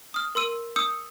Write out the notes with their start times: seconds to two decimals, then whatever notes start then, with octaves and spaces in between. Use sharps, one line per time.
0.14 D#6 F6
0.35 A#4 C6 E6 D#7
0.76 D#6 E6 G6 C#7